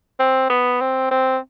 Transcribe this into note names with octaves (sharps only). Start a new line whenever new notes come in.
C4
B3
C4
C4